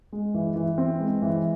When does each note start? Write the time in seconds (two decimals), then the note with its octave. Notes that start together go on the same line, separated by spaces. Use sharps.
0.12 G#3
0.34 E3
0.56 E3
0.78 C4
1.00 G#3
1.22 E3